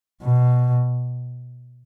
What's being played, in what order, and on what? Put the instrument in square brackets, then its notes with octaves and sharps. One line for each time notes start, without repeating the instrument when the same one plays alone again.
[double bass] B2